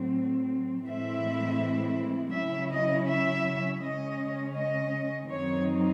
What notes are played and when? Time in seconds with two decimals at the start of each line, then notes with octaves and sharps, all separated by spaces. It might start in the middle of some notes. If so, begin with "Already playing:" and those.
Already playing: A2 F#3 C4
0.86 A2 E3 G#3 C4 E4 E5
2.34 C#3 F#3 C#4 E4 E5
2.71 D#5
3.08 E5
3.82 C#3 G#3 C#4 D#5
4.56 D#5
5.30 F#2 D#3 F#3 C4 D#4 C#5